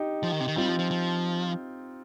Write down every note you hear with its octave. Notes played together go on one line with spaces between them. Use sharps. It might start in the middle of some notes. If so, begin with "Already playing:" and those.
Already playing: D#4 G4
F3
D#3
C3
D#3
G3 C4 F4
F3
F3
F3